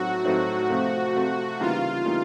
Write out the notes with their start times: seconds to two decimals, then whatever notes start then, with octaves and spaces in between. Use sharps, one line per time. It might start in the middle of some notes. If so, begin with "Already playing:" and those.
Already playing: A2 F#3 A3 C4 D#4 F#4
0.24 A2 F#3 A3 C4 D#4
0.70 C3 F3 A3
1.15 C3 F3 A3
1.60 C#3 E3 G3 A#3 D#4 F4
2.06 C#3 E3 G3 A#3 D#4